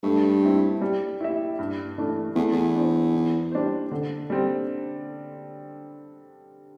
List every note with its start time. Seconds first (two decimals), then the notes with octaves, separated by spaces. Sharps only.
0.03 G2 A3
0.42 C4 E4
0.81 G3
1.21 E4 G4 E5
1.59 G2
1.98 E3 A3 D4
2.36 E2 A3
2.52 E2
2.75 D4 C5
3.14 E3
3.52 G3 D4 C5
3.91 D3
4.30 G3 C4